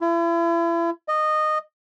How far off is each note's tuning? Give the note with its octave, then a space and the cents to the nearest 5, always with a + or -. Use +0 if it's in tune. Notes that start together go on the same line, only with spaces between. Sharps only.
E4 +40
D#5 -15